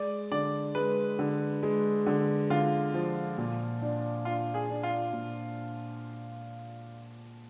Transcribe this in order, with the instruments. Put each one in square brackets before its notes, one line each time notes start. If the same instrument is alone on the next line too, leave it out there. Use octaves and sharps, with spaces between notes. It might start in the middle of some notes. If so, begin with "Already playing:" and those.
Already playing: [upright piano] G#3 [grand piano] D5
[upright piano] D3 [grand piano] D5
[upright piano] G#3 [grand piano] B4
[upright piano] D3
G#3
D3
[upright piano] D3 [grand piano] F4
[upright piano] F3
A#2
D4
[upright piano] D4 [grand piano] F4
[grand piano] G#4
[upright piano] D4
[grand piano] F4
[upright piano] A#2